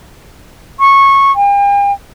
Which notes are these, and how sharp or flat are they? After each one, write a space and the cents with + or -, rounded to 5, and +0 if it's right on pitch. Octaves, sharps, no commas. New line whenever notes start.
C#6 -15
G5 +45